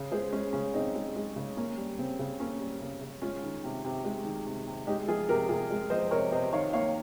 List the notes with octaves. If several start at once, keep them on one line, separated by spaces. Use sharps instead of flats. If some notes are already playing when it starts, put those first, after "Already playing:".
Already playing: C#3
G#3 G#4 C5
G#3 C#4
C#3 C#4
C#3 C4 D#4
G#3
G#3
C#3
A#3 C#4
G3
C#3 C4
C#3
A#3 C#4
G3
C#3
C#3
G#3 C#4 F4
D#3
C3
C3
G#3
D#3
C3
C3
G#3 D#4 G4
F3 F4 G#4
C3 G4 A#4
C3 F4 G#4
G#3
F3 C5 D#5
C3 A#4 C#5
C3 C5 D#5
D#3 C#5 F5
A#3 C#5 F5